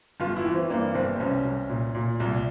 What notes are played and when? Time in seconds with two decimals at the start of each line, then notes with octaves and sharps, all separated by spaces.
0.20 G1 F4
0.37 E4
0.46 E3
0.54 C4
0.70 G2 A#3
0.94 G1 C4
1.20 C2 C#4
1.45 C2
1.69 A#2
1.95 A#2
2.20 C2